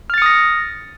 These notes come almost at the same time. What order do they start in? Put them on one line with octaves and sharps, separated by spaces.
F6 A6 C#7 D#6 A#6